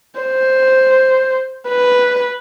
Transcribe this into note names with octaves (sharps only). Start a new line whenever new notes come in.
C5
B4